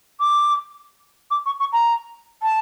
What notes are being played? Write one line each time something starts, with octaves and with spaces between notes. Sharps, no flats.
D6
D6
C#6
C#6
A#5
A5